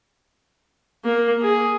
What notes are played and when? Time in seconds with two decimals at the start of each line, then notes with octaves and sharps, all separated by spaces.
1.04 A#3
1.42 G#4